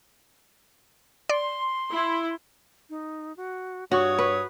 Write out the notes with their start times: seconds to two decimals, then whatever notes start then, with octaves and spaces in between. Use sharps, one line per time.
1.29 D5 C6
1.91 E4
2.90 D#4
3.37 F#4
3.92 G2 F#4 C#5 D#6
4.19 B4